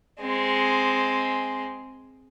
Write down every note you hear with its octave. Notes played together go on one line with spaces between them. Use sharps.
G#3 C4